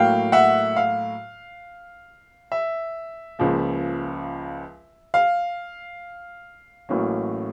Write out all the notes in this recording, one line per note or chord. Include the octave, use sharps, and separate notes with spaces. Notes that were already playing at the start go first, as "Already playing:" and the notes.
Already playing: A2 F#3 A#3 F5 G5
E5 F#5
F5
E5
C#2 C#3 F3 A#3
F5
A1 A2 F#3 A#3 C#4